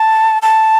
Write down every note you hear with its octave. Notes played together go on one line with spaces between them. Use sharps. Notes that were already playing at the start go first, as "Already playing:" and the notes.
Already playing: A5
A5